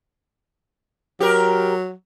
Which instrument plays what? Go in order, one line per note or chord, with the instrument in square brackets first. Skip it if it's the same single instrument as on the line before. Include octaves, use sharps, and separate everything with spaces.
[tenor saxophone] F#3 [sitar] G4 A#4